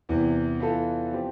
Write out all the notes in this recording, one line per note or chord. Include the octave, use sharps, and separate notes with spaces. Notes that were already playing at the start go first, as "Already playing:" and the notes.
E2 C3 E3
E3 B3 F4 A4
F3 C4 G4